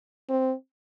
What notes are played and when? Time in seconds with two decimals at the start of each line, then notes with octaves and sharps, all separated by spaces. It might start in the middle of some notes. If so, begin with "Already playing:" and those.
0.29 C4